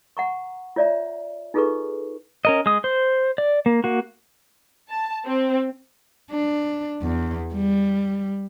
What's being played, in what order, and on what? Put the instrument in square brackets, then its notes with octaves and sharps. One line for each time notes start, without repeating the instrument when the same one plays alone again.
[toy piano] F#5 A#5 C#6
F4 C#5 D5 E5 A#5
D#4 F4 G#4 A4 B4 C#6
[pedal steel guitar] C#4 A#4 D#5
G#3 D#6
C5
D5
A#3
A#3 F#4
[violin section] A5
C4
[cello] D4
E2
G3